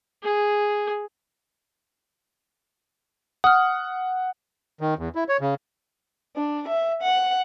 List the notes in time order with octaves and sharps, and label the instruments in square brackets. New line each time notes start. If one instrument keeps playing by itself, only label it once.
[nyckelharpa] G#4
[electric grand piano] F#5 [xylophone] D#6 F6
[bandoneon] D#3
E2
E4
C#5
C#3
[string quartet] D4
E5
F#5